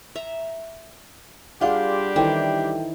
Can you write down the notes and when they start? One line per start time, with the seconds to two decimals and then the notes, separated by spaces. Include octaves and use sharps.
0.15 E5 A#5
1.61 G3 D4 F4 G4 G#4 F5 F#5 C6
2.16 D#3 E3 A4 C5 G5